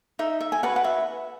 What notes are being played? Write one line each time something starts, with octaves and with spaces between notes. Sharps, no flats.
D#4 E5
E5
G#5
F#4 B4 F#5
F#5
E5